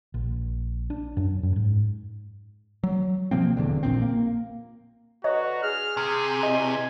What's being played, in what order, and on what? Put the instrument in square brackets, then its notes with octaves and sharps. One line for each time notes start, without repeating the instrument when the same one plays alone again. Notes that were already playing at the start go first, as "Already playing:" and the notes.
[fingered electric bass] A#1
D4
F#2
F#2
G#2
[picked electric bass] F#3
B2 F3 A#3 C4
D1 E2 D3
A#1 A#2 C4
A#3
[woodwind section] D3 B4 A#5 [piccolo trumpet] F#4 [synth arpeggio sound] C#5 D#5
[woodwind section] G#4 [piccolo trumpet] F6
[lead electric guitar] C3 [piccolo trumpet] G#5 [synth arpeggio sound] C6
[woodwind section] E2 B2 [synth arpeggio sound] D#5